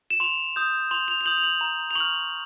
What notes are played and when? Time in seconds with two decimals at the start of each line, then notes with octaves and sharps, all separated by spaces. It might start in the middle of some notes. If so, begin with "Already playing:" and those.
0.10 E7
0.20 C6 F7
0.56 D#6 G6
0.91 C6 F7
1.08 F7
1.21 F7
1.26 D#6 G6 F#7
1.38 F7
1.44 F#7
1.61 A#5
1.91 F7
1.95 C#6 F6 F#7